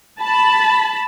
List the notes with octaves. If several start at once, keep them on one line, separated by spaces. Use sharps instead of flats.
A5 B5